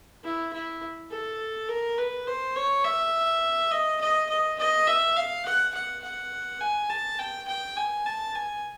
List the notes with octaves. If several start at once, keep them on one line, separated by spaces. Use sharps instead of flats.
E4
E4
A4
A#4
B4
C5
C#5
E5
D#5
D#5
D#5
D#5
E5
F5
F#5
F#5
F#5
G#5
A5
G5
G5
G#5
A5
G#5